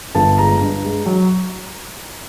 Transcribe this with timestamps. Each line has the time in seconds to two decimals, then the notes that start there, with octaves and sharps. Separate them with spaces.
0.15 G1 A5
0.38 G#3 A#5
0.60 G2
0.84 G#3
1.06 F#3